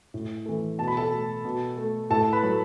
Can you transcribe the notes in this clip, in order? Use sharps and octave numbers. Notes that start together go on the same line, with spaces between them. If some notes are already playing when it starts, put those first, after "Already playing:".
A2
E3 A3
B2 A5
B5
A4 A5
A3
B2
A3
A2 A4 A5
B4 B5
F#3 A3